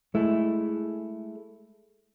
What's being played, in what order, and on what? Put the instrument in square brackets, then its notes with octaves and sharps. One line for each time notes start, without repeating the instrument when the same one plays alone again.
[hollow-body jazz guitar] G#3 A3 E4